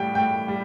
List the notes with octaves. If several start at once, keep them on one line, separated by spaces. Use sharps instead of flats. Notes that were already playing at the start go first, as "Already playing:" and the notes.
Already playing: A2 G3 G5
A2 G5
G3